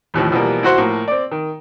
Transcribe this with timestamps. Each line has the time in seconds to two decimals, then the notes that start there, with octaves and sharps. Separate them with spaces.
0.14 A1 D#2 A2 F3
0.32 B2 E3 F3 G3 A#3
0.63 E4 F#4 C5 F#5
0.78 A2 F3 A#3
1.08 C4 D5
1.31 D#3